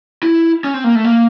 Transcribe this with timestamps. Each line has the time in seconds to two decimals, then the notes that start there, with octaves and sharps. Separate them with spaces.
0.23 E4
0.64 C#4
0.74 C4
0.84 A#3
0.95 A3
1.04 A#3